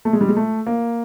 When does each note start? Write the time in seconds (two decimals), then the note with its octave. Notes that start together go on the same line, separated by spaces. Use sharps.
0.05 A3
0.13 G#3
0.21 G3
0.29 G#3
0.37 A3
0.67 A#3